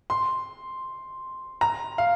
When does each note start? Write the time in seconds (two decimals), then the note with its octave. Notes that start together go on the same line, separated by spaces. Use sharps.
0.10 C6
1.61 A#5
1.98 F5